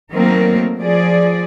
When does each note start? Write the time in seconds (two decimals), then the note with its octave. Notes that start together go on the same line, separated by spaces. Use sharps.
0.12 D#3 F#3 A3 A#3 C4 A#4
0.80 F3 G#4 D5